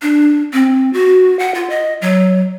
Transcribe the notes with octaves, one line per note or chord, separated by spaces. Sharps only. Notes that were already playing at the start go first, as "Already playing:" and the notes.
D4
C4
F#4
F#5
F4
D#5
F#3